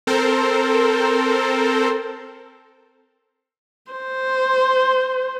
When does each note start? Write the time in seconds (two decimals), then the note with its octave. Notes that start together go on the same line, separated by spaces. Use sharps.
0.07 C4 A4 A#4 C5
3.92 C5